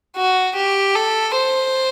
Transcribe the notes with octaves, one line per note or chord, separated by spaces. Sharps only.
F#4
G4
A4
C5